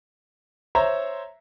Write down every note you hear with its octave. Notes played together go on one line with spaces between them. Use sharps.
C5 C#5 E5 A#5